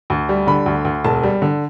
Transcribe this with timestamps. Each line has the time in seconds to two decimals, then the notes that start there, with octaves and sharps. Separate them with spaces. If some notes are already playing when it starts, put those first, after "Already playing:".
0.10 D2
0.29 G3
0.47 D3 B5
0.66 D2
0.85 D2
1.04 E1 A5
1.23 G3
1.42 D3